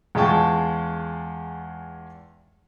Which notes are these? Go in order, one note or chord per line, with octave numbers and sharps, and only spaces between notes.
E2 G#3 F4 G5 A5 C#6